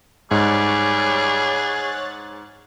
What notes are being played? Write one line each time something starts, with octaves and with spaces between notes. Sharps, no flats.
G#2 G3 G#4 C#5 F#6 A6